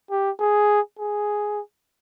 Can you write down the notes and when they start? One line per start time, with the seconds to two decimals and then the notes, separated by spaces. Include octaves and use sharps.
0.10 G4
0.40 G#4
0.99 G#4